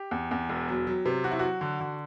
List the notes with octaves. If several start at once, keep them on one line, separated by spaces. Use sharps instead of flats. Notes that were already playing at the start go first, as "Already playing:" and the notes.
Already playing: G4
E2
E2
E1
F#3
F#3
C3
F#3 F#4
E4
F#3 F#4
D3
D3